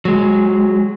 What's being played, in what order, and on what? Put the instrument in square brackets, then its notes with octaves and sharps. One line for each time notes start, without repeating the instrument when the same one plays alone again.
[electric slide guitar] F#3 G#3